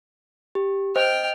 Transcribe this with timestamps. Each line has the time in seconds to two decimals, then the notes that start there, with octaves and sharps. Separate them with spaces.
0.55 G4
0.96 C5 D#5 G5 F6